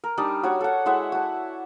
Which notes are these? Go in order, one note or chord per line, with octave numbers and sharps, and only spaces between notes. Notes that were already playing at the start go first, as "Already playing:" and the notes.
A#4
G3 D4 D#4
F#4 C#5 D5
A4 F#5
G#3 E4 E5 F#5
F#4 A5